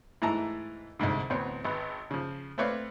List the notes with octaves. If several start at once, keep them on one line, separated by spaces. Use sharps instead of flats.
G#2 E3 A3 A5 A#5 E6
C2 F2 G#2 D3
A1 D2 B3 C4 C#5
G#1 B4
C#3 F3
A3 C4 B4 C#5 D5 F5